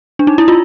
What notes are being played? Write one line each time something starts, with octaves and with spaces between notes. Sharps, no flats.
D4
D#4
E4
F4